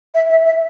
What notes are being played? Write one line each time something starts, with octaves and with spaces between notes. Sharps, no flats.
E5
E5
E5